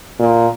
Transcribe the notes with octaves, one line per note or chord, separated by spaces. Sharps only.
A#2